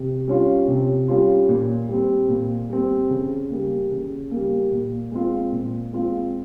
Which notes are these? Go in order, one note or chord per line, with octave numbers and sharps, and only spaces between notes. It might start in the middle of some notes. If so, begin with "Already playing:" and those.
Already playing: C3
G3 C#4 F4
C3
G3 C#4 F4
A#2
G3 C4
A#2
G3 C4
C#3
G3 A#3
C#3
G3 A#3
A#2
G#3 C4 F4
A#2
G#3 C4 F4